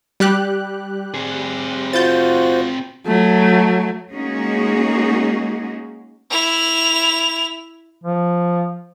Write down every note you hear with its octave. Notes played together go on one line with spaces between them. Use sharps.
G3 G4 F#6
C4 G#4
F4 F#4 C5 G6 A6
F#3 A3
G#3 A#3 C#4 D#4 F#4 G#4
E4 F7
F3